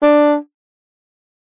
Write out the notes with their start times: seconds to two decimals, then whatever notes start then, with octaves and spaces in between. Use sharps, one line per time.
0.03 D4